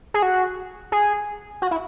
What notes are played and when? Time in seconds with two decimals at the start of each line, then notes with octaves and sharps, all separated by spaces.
0.14 G#4
0.22 F#4
0.92 G#4
1.62 F#4
1.71 E4